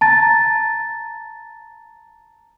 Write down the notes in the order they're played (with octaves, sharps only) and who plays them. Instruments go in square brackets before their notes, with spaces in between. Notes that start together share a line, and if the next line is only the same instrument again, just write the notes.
[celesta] A5 A#5 A6